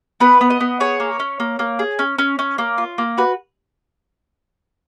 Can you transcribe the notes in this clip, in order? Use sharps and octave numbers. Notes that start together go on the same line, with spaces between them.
B3 B4
B3
D#5
B3
G#4 C#5
A#3
C#4
A#3
A#3
G#4
C#4
C#4
C#4
A#3
F4
A#3
F#4 B4